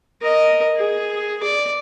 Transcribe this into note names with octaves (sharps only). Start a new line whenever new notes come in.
A#4 D#5
G#4
D5